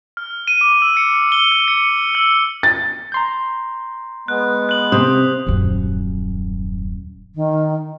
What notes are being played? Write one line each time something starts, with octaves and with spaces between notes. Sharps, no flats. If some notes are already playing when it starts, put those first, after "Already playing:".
F6
D#7
D6
E6
C#7
G7
E6
C#7
E6
A6
A#5 C6 G6
G#3 B3 F#6
F#6 F#7
C3 C5 D#6
D#1 F#2
D#3